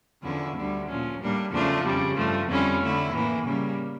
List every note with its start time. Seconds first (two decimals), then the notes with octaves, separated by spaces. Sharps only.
0.22 E2 D3 F3 C#4 E4
0.55 D2 D3 G3
0.87 A#2 F3 C#4
1.20 A2 G3 A#3 D4
1.51 E2 C#3 F3 A3 D4
1.84 F2 C#3 G3
2.15 G2 F3 A3
2.48 F2 D3 G3 C#4 E4
2.81 D3 A3 E4
3.12 A2 E3 A#3
3.45 C#3 G3 A#3